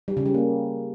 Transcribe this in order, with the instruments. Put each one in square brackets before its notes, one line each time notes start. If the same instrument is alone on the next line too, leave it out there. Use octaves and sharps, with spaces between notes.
[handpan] G3
C#3
G3
A#3